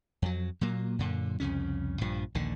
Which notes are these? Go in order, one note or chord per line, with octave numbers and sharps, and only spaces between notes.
F2 F#3
A#2 F#3 A#3
F#2 A#2 D3
C2 F2 C#3 C#4
A#1 G2 F3
A#1 D#2 D3